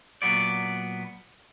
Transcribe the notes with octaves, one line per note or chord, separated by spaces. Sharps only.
A#2 F#3 B3 D5